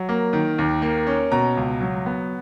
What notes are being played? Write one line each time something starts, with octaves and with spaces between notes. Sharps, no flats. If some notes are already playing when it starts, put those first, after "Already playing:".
Already playing: F#3
A#3
D#3
D#2
A#3
C#4
B2 A#5
C#2
F#3
B3